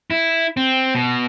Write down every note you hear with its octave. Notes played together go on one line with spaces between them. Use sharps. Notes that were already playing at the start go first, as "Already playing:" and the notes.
E4
C4
B2